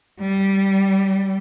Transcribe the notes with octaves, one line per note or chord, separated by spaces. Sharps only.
G3